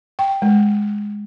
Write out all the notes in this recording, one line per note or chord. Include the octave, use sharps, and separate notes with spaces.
G5
G#3